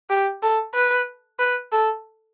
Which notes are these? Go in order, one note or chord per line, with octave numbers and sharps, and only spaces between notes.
G4
A4
B4
B4
A4